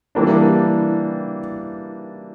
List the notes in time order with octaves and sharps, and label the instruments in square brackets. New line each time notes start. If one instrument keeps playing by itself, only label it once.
[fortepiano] E3 G3 A#3 D4